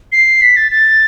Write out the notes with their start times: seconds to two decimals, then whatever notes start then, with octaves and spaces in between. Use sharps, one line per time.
0.12 C7
0.42 B6
0.57 A6
0.71 A6